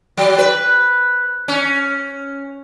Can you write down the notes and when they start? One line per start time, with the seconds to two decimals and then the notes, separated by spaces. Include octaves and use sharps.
0.17 F#3
0.38 B4
1.48 C#4